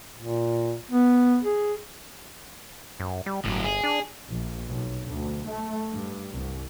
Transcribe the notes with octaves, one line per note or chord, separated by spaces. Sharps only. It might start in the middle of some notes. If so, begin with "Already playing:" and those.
A#2
B3
G#4
F#2
G3
G1 A2 F#3
G#4
D4
A#1
B1
D2
A3
G2
C2